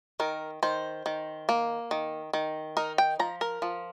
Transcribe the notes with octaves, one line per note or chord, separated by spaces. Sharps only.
D#3 A#4
D#3 C5
D#3
A#3
D#3
D#3
D#4 A#4
G5
F3 A#5
A#4
F3